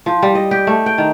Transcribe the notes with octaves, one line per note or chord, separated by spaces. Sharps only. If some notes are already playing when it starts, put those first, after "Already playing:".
F3
G3
D#5
G4
A3
G5
D#3